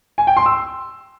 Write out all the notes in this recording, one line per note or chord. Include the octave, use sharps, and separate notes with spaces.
G#5
G5
C6
E6